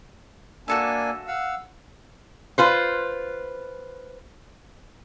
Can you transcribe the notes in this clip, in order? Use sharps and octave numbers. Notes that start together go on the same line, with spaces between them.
A#3 D4 F#4 A4 E5 G#5
F5 F#5 E6
F4 B4 C5